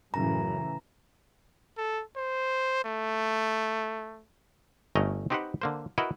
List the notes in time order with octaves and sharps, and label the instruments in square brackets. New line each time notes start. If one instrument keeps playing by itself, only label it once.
[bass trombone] F#2 [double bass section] A2 C#3 E3 [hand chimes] A#5
[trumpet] A4
C5
A3
[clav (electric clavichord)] G1 A3 C#4 D#5 G5 A#5
C4 D#4 G4 B4 C5 F#5
D3 A#3 C5
E4 F#4 A#4 B4 D#5 F#5